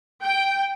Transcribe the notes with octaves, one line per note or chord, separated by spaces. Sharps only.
G5